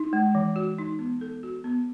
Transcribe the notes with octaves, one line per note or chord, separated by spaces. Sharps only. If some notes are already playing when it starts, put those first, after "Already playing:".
Already playing: D#4
G#3
E3
F#4
D#4
B3
A4
F#4
B3